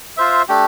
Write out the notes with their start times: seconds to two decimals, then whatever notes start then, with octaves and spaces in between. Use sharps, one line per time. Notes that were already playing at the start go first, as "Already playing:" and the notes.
0.17 F4 C5 E5
0.48 A3 D4 G4